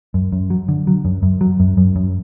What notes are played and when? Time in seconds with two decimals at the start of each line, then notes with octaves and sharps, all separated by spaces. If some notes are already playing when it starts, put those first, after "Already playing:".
0.14 F#2
0.32 F#2
0.50 F#3
0.69 D3
0.87 F#3
1.05 F#2
1.23 F#2
1.41 F#3
1.60 F#2
1.77 F#2
1.96 F#2